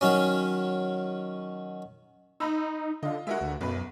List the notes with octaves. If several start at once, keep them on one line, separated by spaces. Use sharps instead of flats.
D#3 F#3 C#4
D#4 A#5 B5 E6
D3 F4 D#5
G#3 F#4 A#4 E5
D2
B1 F#2 B4